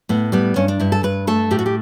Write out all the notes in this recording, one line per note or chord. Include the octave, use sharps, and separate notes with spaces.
A2 B3
G3 B3
G2 C#4
D4
G2 E4
A4
G2 B4
A3 A4
A2 G4
F#4
G4